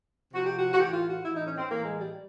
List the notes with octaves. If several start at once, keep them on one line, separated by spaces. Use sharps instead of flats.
C3 F3 F#4
G4
F#4
F#4
A2 E3 G4
F4
F#4
A2 E3 E4
D#4
C#4
C4
A2 E3 A#3
G#3
G3